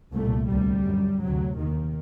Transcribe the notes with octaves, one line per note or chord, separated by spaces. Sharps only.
C2 A#2 A3
D2 C3 G3
F#2
D2 C3 F#3
D#2 D#3